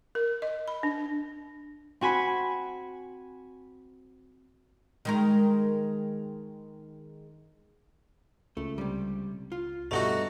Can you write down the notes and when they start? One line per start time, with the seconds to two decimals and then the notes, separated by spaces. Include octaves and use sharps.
0.15 A#4
0.42 D#5
0.68 B5
0.83 D4
2.01 C4 F#4 G#5 B5
5.05 D#3 G#3 A#4
8.57 C#2 A3
8.78 C3 G3
9.52 F4
9.91 G2 B2 A3 D#4 F#4 D5 F#5